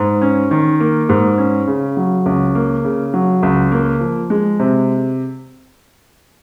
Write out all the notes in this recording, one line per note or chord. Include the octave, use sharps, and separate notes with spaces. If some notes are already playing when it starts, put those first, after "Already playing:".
Already playing: G#2
C#4
D#3
A#3
G#2
C#4
C#3
F#3
C#2
A#3
C#3
F#3
C#2
A#3
F3
G#3
C3